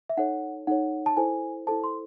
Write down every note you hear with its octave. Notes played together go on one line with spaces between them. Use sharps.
E5
D#4 A4 C#5 F#5
D#4 A4 C#5 F#5
A5
E4 A4 C5 G#5
E4 A4 C5 A5
C6